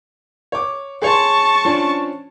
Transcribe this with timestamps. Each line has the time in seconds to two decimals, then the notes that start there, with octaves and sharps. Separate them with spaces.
0.52 C#5 D6
1.02 G#4 C#5 A5 C6 C#6
1.65 F3 C#4 D4